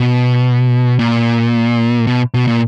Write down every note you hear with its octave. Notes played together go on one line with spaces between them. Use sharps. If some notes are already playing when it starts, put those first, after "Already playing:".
Already playing: B2
A#2
B2
B2
A#2